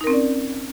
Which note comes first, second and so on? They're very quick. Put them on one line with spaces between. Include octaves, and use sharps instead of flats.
D#4 A#4 C4 C#4 D5